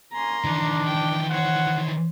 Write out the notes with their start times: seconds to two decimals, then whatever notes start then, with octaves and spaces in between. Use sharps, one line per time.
0.13 A#3 C#4 G#5 A#5 C6
0.44 D#3 E3 D4
0.87 G5
1.30 C5 C#5 F#5